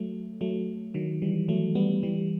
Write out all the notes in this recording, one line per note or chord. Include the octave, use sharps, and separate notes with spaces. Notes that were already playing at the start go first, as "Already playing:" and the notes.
Already playing: F#3 A3
F#3 A3
D#3 F#3
E3 G3
F#3 A3
G3 B3
E3 G3